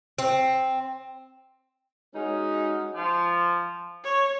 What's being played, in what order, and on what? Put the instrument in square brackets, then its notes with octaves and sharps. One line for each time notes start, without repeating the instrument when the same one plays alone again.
[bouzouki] C4
[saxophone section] G#3 C#4 D#4 F#4 G#4
[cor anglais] F3
[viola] C#5